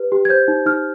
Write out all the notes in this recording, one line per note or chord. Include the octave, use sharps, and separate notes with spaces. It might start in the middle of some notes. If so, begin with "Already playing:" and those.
Already playing: G4 B4
G4
G#6
C5 G6
D#4
D#4 F6